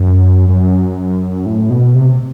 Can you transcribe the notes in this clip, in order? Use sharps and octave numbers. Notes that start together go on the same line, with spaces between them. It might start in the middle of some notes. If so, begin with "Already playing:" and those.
Already playing: F#2
F#2
A2
B2
C3